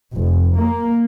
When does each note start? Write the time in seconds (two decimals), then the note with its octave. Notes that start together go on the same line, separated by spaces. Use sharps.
0.14 F1
0.57 A#3